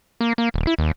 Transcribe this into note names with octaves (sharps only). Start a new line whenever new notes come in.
A#3
A#3
D#1
E4
D#2